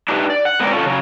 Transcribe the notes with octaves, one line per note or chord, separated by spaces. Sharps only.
D4 D#4 G4 B4 E5
D5
F#5
G#3 B3 C4 F#4 A#4 D5
C#4 F4 A4
C#3 F#3